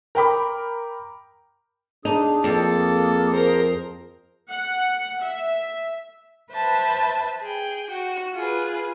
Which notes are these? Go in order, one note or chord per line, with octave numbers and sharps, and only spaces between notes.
A#4 G5 B5 D6
D4 D#4 G#4
F2 A#3 A4
A#4 C5
F#5
E5
B4 C5 E5 A5
G#4 G5
F#4
F4 G#4 B4